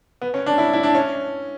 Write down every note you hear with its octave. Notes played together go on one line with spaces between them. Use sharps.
B3
C#4
D4
E4
E4
D4
C#4